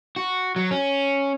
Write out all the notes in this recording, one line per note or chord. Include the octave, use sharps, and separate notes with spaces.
F#4
F#3
C#4